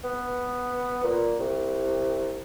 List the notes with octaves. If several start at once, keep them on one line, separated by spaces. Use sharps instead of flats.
B3
A#2
C2